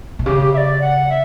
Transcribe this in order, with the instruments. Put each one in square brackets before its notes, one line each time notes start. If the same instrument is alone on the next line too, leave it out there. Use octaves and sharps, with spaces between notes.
[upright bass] B2
[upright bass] C#3 [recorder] G4
[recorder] G4
E5
D5
F#5
E5